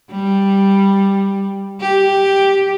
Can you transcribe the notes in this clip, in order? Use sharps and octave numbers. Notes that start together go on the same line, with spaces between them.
G3
G4